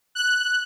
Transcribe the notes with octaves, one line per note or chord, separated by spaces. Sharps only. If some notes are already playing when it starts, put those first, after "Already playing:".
F#6